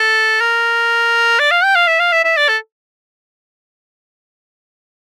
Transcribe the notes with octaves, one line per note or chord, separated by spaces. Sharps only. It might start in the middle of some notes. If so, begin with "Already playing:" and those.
Already playing: A4
A#4
D5
F5
G5
F5
E5
F5
E5
E5
D5
A4